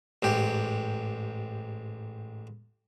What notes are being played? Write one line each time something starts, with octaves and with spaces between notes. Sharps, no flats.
A1 G#2 G4